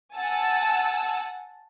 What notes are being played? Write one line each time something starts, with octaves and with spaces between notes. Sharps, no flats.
F#5 G#5 A5 E6